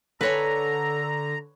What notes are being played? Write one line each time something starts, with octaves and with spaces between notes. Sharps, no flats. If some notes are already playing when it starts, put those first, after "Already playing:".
D3 A4 B4 C#5 G#5 A#5